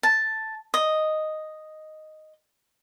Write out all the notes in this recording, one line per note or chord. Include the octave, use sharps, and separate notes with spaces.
A5
D#5